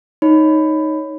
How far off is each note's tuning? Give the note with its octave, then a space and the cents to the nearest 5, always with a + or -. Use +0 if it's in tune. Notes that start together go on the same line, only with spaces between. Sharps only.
D#4 +0 C#5 +0 B5 +15